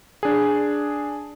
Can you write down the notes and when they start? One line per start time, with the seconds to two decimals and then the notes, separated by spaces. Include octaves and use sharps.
0.23 D4 G#4